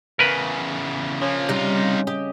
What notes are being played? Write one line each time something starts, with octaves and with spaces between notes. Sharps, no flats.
E2 C#3 A#4 B4
C#3 F3 A#3
C3 G3 D#4 F4
G4 D#5